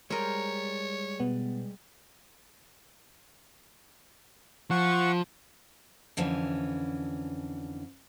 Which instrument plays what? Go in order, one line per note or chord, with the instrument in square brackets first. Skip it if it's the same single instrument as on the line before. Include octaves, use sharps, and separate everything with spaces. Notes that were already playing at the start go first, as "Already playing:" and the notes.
[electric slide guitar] G3 G#3 [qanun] A#4 C5 [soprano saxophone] C#5
[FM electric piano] B2 B3
[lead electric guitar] F3 [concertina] F#5 C#6
[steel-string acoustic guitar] F2 D3 E3 C#4